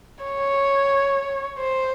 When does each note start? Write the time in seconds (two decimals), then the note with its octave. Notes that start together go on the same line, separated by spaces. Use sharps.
0.24 C#5
1.58 C5